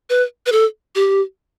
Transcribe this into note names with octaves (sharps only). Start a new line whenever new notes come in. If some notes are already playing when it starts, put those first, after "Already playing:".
B4
B4
A4
G4